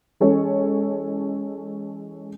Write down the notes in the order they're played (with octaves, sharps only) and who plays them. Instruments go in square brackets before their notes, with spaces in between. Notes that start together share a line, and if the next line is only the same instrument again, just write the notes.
[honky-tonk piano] E3 G#3 C#4 A4 C#5